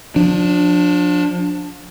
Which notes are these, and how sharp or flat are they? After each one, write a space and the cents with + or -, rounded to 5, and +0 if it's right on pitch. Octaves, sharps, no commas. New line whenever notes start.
F3 +35 D4 +0